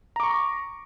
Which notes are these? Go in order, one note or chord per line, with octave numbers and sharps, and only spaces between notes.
A#5 C#6 D6